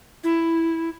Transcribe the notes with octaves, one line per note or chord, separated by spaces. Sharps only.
E4